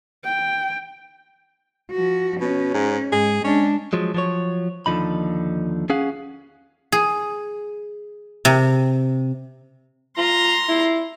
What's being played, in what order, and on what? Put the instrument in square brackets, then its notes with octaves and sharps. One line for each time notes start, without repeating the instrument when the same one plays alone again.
[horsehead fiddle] G5
[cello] F3 F#4
[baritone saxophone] B2 [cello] C#4
[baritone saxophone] G#2
[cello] G#2 [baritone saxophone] G#4
[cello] G#3 D4 [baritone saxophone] C#4
[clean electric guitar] F3 F#3 G#3
F3 F#3 C#5
D#2 D3 F3 D#4 B5
C#4 G#4 F5 F#5
[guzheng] G#4
C3
[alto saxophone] F4 [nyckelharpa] A#5 C6
[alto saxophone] E4